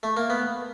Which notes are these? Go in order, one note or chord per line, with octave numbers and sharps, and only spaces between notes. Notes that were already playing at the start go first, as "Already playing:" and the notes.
A3
A#3
B3